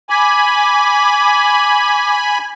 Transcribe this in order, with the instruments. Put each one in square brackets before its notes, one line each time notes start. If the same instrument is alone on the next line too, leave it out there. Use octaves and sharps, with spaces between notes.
[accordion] G#5 B5 [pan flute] D6